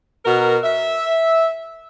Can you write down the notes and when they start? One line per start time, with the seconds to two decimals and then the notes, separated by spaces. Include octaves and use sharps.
0.25 B2 F#4 A#4
0.64 E5